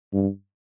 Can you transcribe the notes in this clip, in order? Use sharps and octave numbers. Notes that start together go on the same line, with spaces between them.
G2